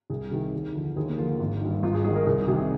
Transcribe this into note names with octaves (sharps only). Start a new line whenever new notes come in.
C2 G#4
C3 D#3
D#2
D3 F3
D#2 G#4
A#3
D3 F3 F4
G#1
G2 D#3
G#1 F4
G#4
G#2 D#3 G#4
A#4
C2 G#4
C3 D#3 G#4